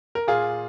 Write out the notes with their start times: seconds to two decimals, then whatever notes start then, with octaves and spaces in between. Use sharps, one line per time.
0.15 A#4
0.27 A#2 F4 G#4